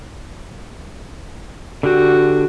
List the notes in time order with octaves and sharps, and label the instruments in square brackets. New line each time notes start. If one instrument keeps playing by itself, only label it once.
[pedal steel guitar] D3 G4 [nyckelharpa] F#4